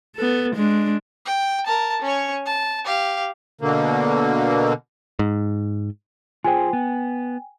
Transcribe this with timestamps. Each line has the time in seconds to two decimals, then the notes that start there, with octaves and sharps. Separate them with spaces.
0.16 B3 A4
0.55 G#3 D4
1.25 G5
1.66 A#4 A5
2.02 C#4 C#5
2.45 A5
2.85 G4 F5
3.61 B2 D3 A#3
5.19 G#2
6.44 F4 G#4 C5 G5 G#5
6.73 B3